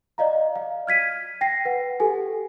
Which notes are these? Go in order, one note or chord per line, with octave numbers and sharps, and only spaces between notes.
D5 D#5 F5 A#5
F5
F6 G#6 B6 D#7
G5 A#6 C7
B4 F#5
G4 A4 G#5